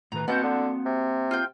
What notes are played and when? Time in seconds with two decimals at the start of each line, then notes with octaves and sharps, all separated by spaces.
0.12 A2 D#3 B4 A#5
0.28 B2 A#3 C4 F#4 F#5 A5 G6
0.43 D3
0.86 C3
1.31 F4 C5 G5